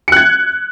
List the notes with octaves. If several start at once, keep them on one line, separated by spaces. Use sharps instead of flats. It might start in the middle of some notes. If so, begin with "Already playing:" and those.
F#6 G#6 C#7